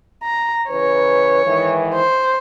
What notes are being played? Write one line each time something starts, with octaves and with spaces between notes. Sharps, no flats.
A#5
C#3 E3 B4 C#5
G#2 D#3 E3
C5